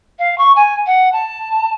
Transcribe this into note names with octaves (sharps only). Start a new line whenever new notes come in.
F5
C#6
G#5
F#5
A5